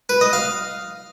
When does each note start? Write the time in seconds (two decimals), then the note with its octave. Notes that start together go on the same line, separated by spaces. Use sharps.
0.09 B4
0.21 D#5
0.33 F5